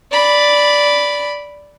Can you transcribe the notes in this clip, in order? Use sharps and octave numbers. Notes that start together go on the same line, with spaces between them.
D5 B5